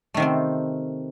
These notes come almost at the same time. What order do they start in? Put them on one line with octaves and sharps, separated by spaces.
A3 D#3 C3 C4